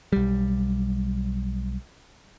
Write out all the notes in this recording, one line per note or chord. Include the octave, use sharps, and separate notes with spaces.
B1 G3